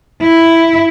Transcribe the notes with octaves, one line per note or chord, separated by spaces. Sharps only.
E4